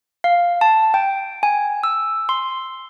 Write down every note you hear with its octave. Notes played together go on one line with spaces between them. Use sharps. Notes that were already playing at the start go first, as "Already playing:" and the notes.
F5
A5
G5
G#5
E6
C6